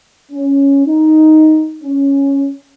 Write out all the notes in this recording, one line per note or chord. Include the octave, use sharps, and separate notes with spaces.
C#4
D#4
C#4